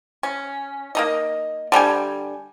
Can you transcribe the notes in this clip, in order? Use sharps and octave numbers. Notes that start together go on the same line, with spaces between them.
C#4
A#3 D#4 D#5
D3 G3 G5 G#5